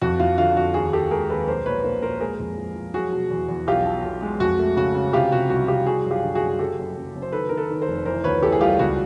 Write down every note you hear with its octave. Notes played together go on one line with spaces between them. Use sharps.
F2 F#4
F2 F4
D3 F4
F2 F#4
D#2 F#4 G#4
D#3 G4 A4
G#3 G#4 A#4
D#2 A4 B4
B1 A#4 C5
A#2 B4 C#5
A#2 A#4 C5
A#2 A#4 C5
G#3 G#4 A#4
F2
F3
F3
F#3 F#4 G#4
B2
E2
E2
B1 F4 G4
B2
B1
G#3
F2 F#4
A3
C#3 F#4
C#3
C3 F4 G4
C3 F#4
C2 F#4
C2 F4 G4
G3 F#4 G#4
F#2
F4 G4
D3
F#4 G#4
F#2
F#1 G4 A4
F#1
F#1
F#1
C5
D#3 A4 B4
D#3 A#4
A4 B4
D#3
A#4 C5
F1
E3 A#4 C5
D2 B4 C#5
E3 G4 A4
G#4
G3 F4 G4
C#2 F#4